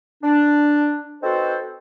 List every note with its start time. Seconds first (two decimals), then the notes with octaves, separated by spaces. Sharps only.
0.23 D4
1.22 C4 D#4 F#4 A4 B4 C5